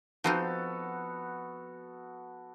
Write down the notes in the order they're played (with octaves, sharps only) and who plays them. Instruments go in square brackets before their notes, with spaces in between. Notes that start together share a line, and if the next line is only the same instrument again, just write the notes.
[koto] F3 C4 D#4 [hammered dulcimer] B3 F#4 A4